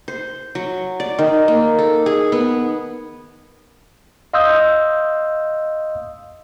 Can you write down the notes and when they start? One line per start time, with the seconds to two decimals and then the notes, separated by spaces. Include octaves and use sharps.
0.08 C5
0.55 F#3
1.00 D5
1.19 D#3
1.48 A#3
1.78 A4
2.06 G#4
2.32 B3
4.33 D#5 F5 C6 D#6 E6 G6